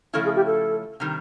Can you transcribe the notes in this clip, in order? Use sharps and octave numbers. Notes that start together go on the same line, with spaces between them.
C#3 F3 A3 C#4 E4 A4
G#4
G4
A4
C3 D#3 G3